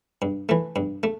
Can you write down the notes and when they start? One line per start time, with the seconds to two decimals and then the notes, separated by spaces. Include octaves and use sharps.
0.22 G2
0.49 E3 A3
0.76 G2
1.03 A3